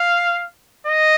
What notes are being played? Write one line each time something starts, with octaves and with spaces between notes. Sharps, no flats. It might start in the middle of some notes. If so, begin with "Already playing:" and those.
Already playing: F5
D#5